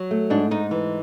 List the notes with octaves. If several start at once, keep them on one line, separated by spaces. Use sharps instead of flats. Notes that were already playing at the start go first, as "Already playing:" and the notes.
Already playing: F#3
A3
G#2 D4
G#2 D#4
E3